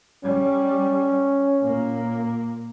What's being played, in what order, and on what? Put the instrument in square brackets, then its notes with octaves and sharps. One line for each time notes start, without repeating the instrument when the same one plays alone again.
[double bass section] G3 [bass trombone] C#4
[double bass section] A#2 A#3